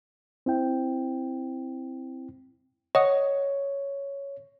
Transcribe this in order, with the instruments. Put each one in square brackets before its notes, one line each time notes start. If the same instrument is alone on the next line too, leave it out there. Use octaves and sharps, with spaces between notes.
[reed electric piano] C4 E4 G5
[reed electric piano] C#5 [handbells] D#5 F#5 D#6